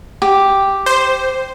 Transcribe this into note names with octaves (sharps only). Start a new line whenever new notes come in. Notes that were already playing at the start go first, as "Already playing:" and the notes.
G4
C5